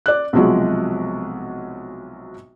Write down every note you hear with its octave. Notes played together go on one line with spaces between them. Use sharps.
D5 F#6
B1 C3 F3 F#3 G#3